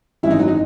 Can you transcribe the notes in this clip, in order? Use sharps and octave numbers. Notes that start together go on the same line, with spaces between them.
G#1 F#2 E3 G#3 E4
D#4
F#3
D#4